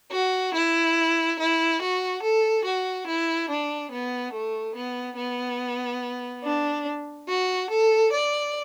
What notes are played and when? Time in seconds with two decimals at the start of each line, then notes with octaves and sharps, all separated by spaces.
0.12 F#4
0.54 E4
1.38 E4
1.81 F#4
2.23 A4
2.64 F#4
3.07 E4
3.49 D4
3.91 B3
4.33 A3
4.75 B3
5.17 B3
6.44 D4
7.28 F#4
7.70 A4
8.12 D5